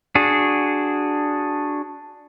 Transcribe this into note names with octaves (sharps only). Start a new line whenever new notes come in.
D4 F#4 G#4